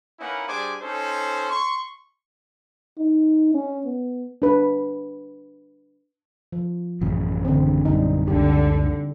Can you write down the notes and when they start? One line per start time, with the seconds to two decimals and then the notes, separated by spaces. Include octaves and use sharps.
0.19 A#3 C#4 D#4 E4 B4 F#5
0.48 G3 D4 G#4 C5 G#5 D6
0.80 C#4 D#4 A4 C5
1.50 C6 C#6
2.99 D#4
3.54 C#4
3.86 B3
4.42 D4 B4
6.52 F3
7.01 A1 F#2 C#3
7.45 D3 C4
7.85 A#1 F#2 G3 D4 D#4
8.28 F#1 C#2 D3 G4